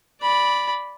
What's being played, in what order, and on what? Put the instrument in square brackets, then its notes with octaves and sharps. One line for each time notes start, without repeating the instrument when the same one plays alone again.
[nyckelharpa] D5 B5